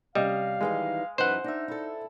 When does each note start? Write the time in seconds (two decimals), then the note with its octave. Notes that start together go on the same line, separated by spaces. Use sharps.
0.15 C3 G3 C#4 D#5 F5
0.61 D#3 E3 G#3 D#4
1.18 F#2 E3 D#4 B4 C5 F#5
1.44 D4 D#4 E5
1.68 E4 A4